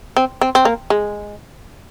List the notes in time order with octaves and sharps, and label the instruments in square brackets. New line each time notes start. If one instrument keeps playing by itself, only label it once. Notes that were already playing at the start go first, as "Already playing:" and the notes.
[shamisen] C4
C4
C4
A#3
G#3